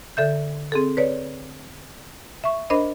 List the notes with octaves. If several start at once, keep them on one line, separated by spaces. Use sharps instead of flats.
D3 A4 E5 G6
C4 G#4 A4
B4 C#5 D5
E5 C#6
D4 A#4 C5 D#5 B5